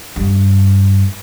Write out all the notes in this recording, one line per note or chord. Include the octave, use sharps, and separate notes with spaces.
G2